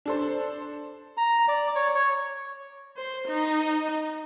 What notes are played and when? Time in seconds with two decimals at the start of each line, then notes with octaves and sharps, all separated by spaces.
0.06 D4 A4 C5
1.17 A#5
1.48 D5
1.75 C#5
1.94 C#5
2.97 C5
3.27 D#4